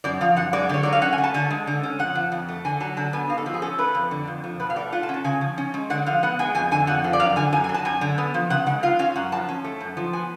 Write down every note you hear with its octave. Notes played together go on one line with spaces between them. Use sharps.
F#2 D5
F3 F5
F#2 F#5
G#3 D5
D3 C#5
F#3 D5
F5
C#4 F#5
G#5
A3
A5
D3 G#5
G#3
D3
C#4
F2 F#5
F3
F2
A3
D3 G#5
F#3 A5
D3 A5
B3 G#5
G#2 F5
A4
F3 F#4
G#4
C#4 A4
A3 B4
F2
D3
F2
F3
B2 B4
F5
A3 D5
F4 F#5
A5
C#4
A5
C#3 G#5
F3
C#4
G#3
D3 F#5
F3 F5
B3 F#5
G#3 G#5
F2 G#5
D3 G#5
F2 F#5
F3
D5
F#2 F5
D3 G#5
F#2 G#5
G#5
F#3
A5
F#2 G#5
D3
B3
F3
C#3 F#5
G#3 F#5
F4 F5
C#4 F5
F#2 F#5
F3 A5
C#4
A3
F#2
F3
B3 G#5